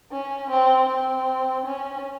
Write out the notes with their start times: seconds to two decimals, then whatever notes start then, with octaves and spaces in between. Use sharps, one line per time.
0.12 C#4
0.50 C4
0.88 C4
1.65 C#4